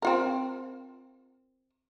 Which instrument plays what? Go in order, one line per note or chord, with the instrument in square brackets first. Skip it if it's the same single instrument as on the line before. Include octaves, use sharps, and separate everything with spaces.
[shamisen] C4 F4 A#4